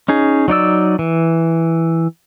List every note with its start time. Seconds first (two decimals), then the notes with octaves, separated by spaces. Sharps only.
0.08 C#4 D#4 G#4
0.48 F#3 D#4 D5 E6
0.99 E3